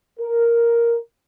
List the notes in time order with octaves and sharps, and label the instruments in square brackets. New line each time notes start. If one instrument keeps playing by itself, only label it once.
[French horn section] A#4